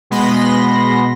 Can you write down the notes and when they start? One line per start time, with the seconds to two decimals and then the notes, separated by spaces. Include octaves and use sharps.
0.10 B2 G#3 B3 B5 C6 A#6